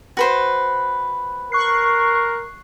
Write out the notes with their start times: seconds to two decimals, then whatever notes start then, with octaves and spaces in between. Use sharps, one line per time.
0.17 F#4 B4 C5
1.52 A#4 C#6 F#6 C7